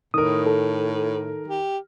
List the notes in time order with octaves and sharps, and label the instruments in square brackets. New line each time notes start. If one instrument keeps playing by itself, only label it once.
[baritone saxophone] A2 [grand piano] D#3 A#4 [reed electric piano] D#6
[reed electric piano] A4
[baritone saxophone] G4